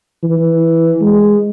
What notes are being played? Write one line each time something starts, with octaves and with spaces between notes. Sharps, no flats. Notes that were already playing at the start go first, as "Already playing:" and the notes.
E3
G#3